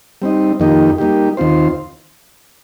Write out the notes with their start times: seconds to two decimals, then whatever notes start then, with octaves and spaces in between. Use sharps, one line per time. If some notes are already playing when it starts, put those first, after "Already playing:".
0.22 G3 C4 D#4
0.60 F2 D#3 A#3 D#4 G4
0.98 G3 A#3 D#4 G4
1.37 D#2 D#3 C4 F4 C5